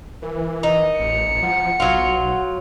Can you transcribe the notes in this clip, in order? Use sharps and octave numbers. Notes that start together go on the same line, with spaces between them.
E3 A#4
D#4
A1 C#7
F3 F#5
B1 F#3 F4